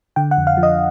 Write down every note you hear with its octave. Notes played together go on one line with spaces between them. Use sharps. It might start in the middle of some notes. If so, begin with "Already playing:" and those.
D3 G5
F#5
F2
F5
F3
D#5